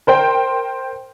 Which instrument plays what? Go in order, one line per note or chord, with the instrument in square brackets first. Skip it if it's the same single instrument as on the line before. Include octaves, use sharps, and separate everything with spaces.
[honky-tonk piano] A#4 C5 G5